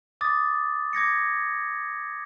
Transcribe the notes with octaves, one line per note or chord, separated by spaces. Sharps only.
D6 D#6 A6
D6 G#6 A#6 C#7